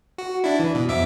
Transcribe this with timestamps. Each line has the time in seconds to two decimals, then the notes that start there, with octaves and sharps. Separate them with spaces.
0.18 F#4
0.44 D4 E4
0.59 E3
0.75 B2
0.88 F2 E5 D6